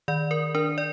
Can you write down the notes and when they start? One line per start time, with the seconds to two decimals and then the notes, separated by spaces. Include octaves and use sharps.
0.08 D#3 D5
0.31 A#4
0.55 D4 A#4
0.78 D5